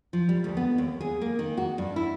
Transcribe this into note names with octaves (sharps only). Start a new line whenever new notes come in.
F3
G3
D2
B3
D#2
G#4
A#3
D#3
F#4
G2
E4